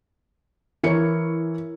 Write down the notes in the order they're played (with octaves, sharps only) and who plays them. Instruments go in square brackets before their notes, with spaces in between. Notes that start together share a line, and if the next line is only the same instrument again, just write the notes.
[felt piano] E3 C#7 [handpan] E4 A#4 C#5